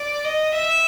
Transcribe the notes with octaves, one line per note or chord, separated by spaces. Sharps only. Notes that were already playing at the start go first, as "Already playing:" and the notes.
Already playing: D5
D#5
E5